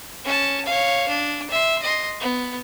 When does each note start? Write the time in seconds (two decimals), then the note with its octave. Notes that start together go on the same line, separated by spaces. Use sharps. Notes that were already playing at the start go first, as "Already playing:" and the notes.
0.24 C#4 A5
0.65 C#5 F5
1.09 D4
1.50 E5 C6
1.82 D#5 C6
2.20 B3